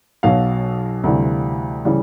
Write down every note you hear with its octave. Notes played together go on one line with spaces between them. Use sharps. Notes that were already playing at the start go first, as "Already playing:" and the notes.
B1 B2 F#3 F5
D2 C3 E3 G3
C#3 E3 G3